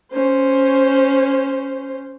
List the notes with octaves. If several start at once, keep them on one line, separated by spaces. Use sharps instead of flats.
C#4 C5